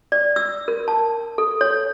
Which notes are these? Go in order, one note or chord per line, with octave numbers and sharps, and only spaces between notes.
D5
E6
A#4
A5
A4
C#5